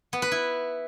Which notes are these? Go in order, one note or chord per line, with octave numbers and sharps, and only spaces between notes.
B3
B4
E4